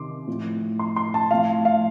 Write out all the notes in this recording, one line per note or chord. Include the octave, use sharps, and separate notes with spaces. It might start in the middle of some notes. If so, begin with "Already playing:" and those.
Already playing: C3 D#3 C6 D6
A2 F3
C6
C6
A5
A2 F3 F5
F5